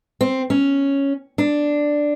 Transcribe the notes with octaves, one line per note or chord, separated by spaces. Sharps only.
C4
C#4
D4